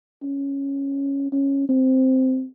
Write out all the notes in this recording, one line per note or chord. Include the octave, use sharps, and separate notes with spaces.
C#4
C#4
C4